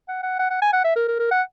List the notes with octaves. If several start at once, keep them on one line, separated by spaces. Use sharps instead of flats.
F#5
F#5
F#5
F#5
G#5
F#5
E5
A#4
A#4
A#4
F#5